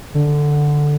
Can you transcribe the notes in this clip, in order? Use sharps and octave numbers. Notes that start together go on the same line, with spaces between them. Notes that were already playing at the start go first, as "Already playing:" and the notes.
D3